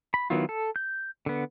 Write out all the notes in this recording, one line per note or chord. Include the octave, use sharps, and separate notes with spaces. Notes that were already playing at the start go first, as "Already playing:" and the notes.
B5
D#3 F#3 B3 E4 F4
A4
G6
D3 B3